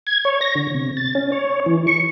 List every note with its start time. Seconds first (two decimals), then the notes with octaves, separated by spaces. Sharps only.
0.07 G#6
0.25 C#5
0.41 A#6
0.55 D3
0.74 C3
0.97 A6
1.15 C#4
1.32 C#5
1.66 E3
1.87 C#6